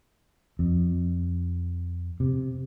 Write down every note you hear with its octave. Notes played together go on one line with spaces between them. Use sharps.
F2
C3